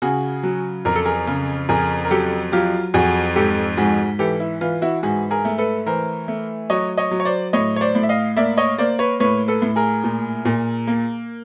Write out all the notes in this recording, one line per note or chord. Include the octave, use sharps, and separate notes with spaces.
C#3 F#4 G#4
F#3
F2 A#4
A4
G#4 A#4
C#3
F2 G#4 A#4
A#4
F#3 G4 A4
F#3 F4 G4
F2 F#4 G#4
G#2 G4 A4
G#2 F#4 G#4
E3 G4 A4
E4
E3 F4
E4 F#4
G#2 F#4 G#4
G#4 A#4
A3
A4 B4
E3 A#4 C5
A3
F#3 C#5 D#5
C#5 D#5
F#3
C#5
C5 D5
A2 C#5 D#5
C#5
C5 D5
A2
E5
D#5 F5
A#3 D5 E5
C#5 D#5
A#3 C5 D5
B4 C#5
A2 B4 C#5
A4 B4
A2
G#4 A#4
A#2
A#2
A#3